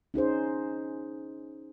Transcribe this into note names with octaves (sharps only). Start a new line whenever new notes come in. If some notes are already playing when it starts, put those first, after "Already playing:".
C#4 D#4 G#4 C5